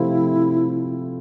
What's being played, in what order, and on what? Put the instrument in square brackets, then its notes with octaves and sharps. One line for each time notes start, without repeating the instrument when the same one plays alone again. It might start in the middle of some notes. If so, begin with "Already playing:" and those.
Already playing: [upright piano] C3 F3 A3 C4 F4 [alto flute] E4